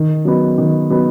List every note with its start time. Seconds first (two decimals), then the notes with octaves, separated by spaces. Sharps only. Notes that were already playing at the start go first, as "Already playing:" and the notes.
Already playing: D#3
0.25 F#3 B3 D#4
0.58 D#3
0.90 F#3 B3 D#4